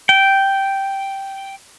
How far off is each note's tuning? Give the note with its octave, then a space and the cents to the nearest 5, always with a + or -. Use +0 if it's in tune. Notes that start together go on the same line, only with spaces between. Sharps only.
G5 -5